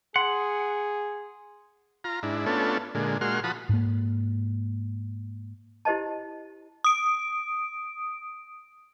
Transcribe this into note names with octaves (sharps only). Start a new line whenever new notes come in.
G#4 F#5 C6
F4 A#5
G#2 D4 E4
A3 B3 C#4 D4 F4 A4
A#2 D3 G#3
A#2 G#3 F#4 C6 F6
F3 F#4 A5 B5 D#6
G#2 A#3
E4 G4 C5 D#5 A5
D#6 D7